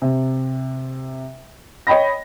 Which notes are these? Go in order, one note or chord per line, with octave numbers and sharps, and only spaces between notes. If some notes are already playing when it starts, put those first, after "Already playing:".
C3
C#5 D#5 G5 B5 A#6